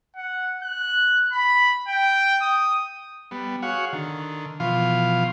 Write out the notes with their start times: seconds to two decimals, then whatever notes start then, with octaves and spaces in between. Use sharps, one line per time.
0.16 F#5
0.63 F#6
1.32 B5
1.88 G5
2.42 D#6
3.31 G3 B3
3.62 F#4 G#4 C#5 F5 F#5
3.93 D3 D#3
4.60 B2 E3 F3 F4 F5